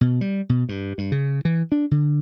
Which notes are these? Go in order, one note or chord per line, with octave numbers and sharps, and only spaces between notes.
B2
G3
B2
G2
G2
C#3
E3
D4
D3